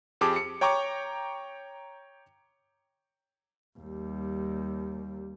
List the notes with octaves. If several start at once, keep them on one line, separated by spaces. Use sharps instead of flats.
F2 G4 G#4 A5 D6
C#7
C#5 G5 A#5 C#6 D6
D#2 G3